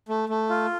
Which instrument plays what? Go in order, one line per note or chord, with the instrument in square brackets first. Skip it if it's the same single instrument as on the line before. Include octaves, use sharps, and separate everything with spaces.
[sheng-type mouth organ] A3
A3
F4